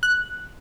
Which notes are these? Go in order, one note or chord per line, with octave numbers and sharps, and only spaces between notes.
F#6